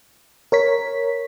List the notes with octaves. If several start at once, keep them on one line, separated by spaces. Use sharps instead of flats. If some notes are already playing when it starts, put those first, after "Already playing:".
A#4 C#5 B6